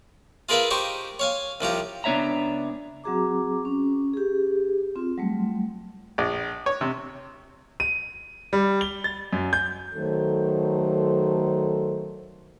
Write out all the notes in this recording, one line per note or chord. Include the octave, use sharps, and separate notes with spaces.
F4 G#4 A#4 B4 E5 F5
D#4 G4 C5 C#6
C#5 F5 G#5
C2 F3 G4 A#5
C#2 B3 D4 C#5 E5 A#5
F#3 C4 F#4 G#4 A#5 D6
C#4
G4 G#4
C4 F4
F#3 G3 A3
A#1
C#5
C3
D#7
G3
G7
A6
F#2
G6
D#3 F#3 A3 A4 C5